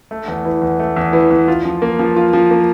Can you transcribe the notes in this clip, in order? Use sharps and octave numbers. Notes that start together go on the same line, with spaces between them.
A3
E2
E3
E2
A3
E2
E3
E2
F4
F3
A#3
F3
F4
F3
A#3